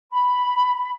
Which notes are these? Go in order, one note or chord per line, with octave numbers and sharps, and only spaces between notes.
B5